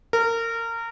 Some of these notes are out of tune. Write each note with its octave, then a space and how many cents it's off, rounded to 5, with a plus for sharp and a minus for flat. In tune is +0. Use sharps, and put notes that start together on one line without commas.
A#4 -25